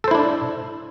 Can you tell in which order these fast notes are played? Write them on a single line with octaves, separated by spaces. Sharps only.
A4 C5 E4 D4